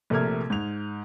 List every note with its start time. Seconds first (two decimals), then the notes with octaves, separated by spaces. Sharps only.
0.10 A#1 C3 A3 A#4 F6 G#6
0.50 G#2 F7